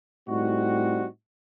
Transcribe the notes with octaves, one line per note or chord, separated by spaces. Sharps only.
A2 G3 C4 D#4 F#4